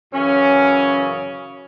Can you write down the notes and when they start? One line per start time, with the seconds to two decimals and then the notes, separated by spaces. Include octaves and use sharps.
0.13 F#2 C#3 E3 C#4